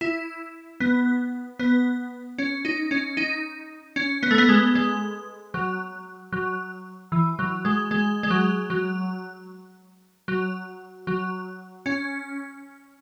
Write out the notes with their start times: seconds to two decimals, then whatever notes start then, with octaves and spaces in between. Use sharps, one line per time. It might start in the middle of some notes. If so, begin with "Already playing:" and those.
0.01 E4
0.80 B3
1.59 B3
2.38 C#4
2.65 D#4
2.91 C#4
3.17 D#4
3.96 C#4
4.23 B3
4.31 A3
4.38 B3
4.49 G#3
4.75 G#3
5.54 F#3
6.33 F#3
7.12 E3
7.39 F#3
7.65 G#3
7.91 G#3
8.23 G#3
8.30 F#3
8.70 F#3
10.28 F#3
11.07 F#3
11.86 C#4